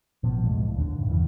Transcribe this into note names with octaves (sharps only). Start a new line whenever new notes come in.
A1 B2 F3 B3
C2 F2 A2 G#3
D#2 D3 D#3
A#1 G2
E2 G2 C#3 E3